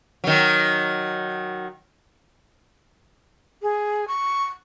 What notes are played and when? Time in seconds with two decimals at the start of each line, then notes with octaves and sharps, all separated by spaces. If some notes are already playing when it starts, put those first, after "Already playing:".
0.24 D#3 F#3
3.63 G#4
4.08 C#6